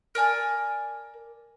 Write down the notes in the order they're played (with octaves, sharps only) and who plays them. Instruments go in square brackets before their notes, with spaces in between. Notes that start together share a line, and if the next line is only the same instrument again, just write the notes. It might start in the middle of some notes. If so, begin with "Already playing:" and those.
[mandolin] A#4 D5 G#5 A5